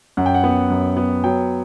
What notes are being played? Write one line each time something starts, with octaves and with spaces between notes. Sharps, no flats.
F#2 F#5
G5
F#5
B3
F#2
B3
F#3 G5